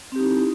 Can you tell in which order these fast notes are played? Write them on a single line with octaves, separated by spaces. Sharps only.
C4 G4 D#4 E4